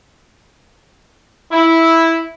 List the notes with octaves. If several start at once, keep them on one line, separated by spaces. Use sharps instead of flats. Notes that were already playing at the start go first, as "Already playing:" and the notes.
E4